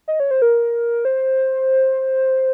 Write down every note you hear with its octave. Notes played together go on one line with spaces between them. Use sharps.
D#5
C#5
C5
A#4
C5